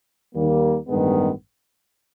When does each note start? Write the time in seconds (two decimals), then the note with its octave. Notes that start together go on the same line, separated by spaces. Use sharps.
0.35 D#2 D#3 G3 A#3
0.88 A1 G2 D#3 G#3 B3